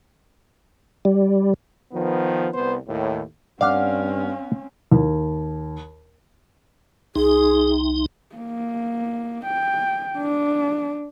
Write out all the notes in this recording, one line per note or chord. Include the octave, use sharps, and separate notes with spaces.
G3
D#3 F3 B3
C2 B3 C5
D#2 A2
G2 C4 C#4 D5 F5 F#5 F6
D#2
C2 D#4 G#4
A#3
G5
D4